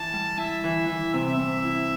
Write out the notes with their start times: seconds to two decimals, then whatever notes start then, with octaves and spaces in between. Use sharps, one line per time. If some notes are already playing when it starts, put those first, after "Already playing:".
Already playing: E3 A5
0.13 G3
0.38 E4 E5
0.64 E3
0.88 E3
1.14 C3 E5
1.39 C3
1.64 E4